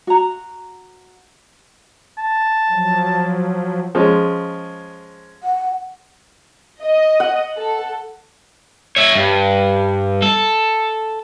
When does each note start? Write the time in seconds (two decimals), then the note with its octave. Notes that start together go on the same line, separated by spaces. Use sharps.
0.07 F#4 A#5
2.18 A5
2.70 F3 F#3
3.95 F3 G#3 C#4
5.43 F#5
6.82 D#5
7.20 F#5
7.59 A4
8.96 C#5 E5
9.15 G2
10.22 A4